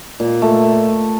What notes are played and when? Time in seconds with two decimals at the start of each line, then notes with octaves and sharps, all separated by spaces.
0.20 A#2
0.42 A3